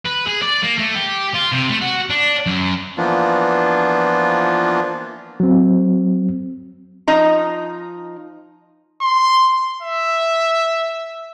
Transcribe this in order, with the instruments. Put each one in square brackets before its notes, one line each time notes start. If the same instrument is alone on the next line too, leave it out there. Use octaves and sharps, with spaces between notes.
[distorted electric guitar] B4
G#4
D5
A#3
A3
G4
F4
C3
A3
F#4
D4
F#2
[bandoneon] E3 F3 A#3 B3 D4 F4
[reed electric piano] F#3 C4
[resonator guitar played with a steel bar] F3 D#4 A#5
[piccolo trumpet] C6
E5